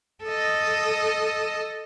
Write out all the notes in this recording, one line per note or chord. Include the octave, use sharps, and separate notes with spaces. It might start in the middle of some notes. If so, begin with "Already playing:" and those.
A4 D#5